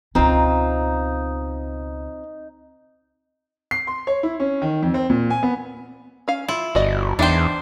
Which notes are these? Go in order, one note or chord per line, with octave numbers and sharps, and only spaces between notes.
C#2 B2 C4 D#4 F4
C7
C6
C#5
E4
C#4
D#3
F2
C4
A#2
G#5
B3
C#4 F5
E4 F4
G1 F#4 D5 D#5
E2 D4 D#4 C5 E5 G5